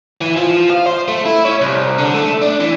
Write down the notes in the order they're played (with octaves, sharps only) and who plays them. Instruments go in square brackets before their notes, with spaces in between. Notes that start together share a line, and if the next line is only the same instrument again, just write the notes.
[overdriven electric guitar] E3
F3
F5
C5
A3
E4
C#4
C2
D3
A3
D4
E3